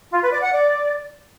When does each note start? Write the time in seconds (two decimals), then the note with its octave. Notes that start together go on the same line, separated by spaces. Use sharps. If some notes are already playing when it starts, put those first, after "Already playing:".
0.12 F4
0.22 B4
0.32 D5
0.42 F#5
0.52 D5